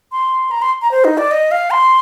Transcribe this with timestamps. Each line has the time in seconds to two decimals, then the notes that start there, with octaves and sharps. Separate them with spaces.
0.12 C6
0.51 A#5
0.62 C6
0.82 A#5
0.91 C5
1.04 D#4
1.18 D5
1.31 D#5
1.51 F5
1.71 C6